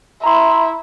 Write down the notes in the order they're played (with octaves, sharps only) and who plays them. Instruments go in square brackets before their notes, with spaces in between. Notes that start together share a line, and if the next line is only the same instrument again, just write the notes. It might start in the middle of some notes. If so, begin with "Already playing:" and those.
[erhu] E4 [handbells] A#5 C6